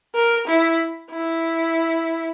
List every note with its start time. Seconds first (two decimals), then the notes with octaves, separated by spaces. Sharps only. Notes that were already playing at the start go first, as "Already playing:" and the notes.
0.15 A#4
0.47 E4
1.11 E4